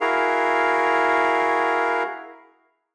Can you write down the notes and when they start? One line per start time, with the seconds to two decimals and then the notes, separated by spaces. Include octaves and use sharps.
0.01 E4 F#4 G#4 A#4 F5